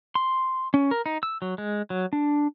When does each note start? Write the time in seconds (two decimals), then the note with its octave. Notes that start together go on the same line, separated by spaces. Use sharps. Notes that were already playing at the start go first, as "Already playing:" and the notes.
0.15 C6
0.74 C#4
0.91 A#4
1.06 D#4
1.23 E6
1.42 F#3
1.58 G#3
1.90 F#3
2.13 D4